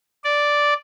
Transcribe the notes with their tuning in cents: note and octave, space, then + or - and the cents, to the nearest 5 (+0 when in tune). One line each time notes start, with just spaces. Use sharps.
D5 -5